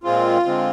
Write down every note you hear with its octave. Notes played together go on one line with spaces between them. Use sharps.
A#2 G#3 C4 F4
D3 G#3 C4